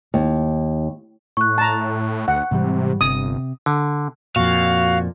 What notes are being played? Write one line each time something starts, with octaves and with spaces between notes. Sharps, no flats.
D#2
A2 C#6 F#6
A5 A#5
D2 F#5
G#2 C3 E3 G3
G1 C3 D#6
D3
F2 A#2 F#4 F5